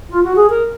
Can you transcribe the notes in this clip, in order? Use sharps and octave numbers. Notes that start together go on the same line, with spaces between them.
F4
F#4
G#4
A#4